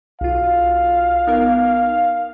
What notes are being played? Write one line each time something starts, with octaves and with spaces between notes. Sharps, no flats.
B1 F4 F5
B3 D#4 A#4